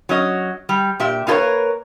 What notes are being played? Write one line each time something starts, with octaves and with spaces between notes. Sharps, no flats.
F#3 C#4 D#5
G3
A#2 G4 E5
A#3 D#4 E4 A#4 B4 C#5